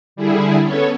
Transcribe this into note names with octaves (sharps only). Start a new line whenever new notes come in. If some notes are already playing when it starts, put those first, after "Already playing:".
D3 G3 E4 G#4
B3 C#4 A4 C#5